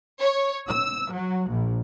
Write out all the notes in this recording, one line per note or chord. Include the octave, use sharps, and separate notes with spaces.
C#5
E6
F#3
A#1